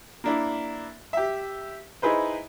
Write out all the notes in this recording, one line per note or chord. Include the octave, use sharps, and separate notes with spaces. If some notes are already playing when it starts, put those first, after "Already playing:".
A#3 D4 E4
G4 E5
D#4 E4 G#4 B4 C5